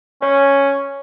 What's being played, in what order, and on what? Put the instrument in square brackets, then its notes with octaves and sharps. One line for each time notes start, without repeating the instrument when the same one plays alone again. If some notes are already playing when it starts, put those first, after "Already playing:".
[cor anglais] C#4 [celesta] C#5